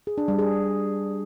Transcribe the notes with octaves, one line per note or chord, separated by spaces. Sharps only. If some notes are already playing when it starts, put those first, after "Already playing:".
G#4
D4
G3
G#4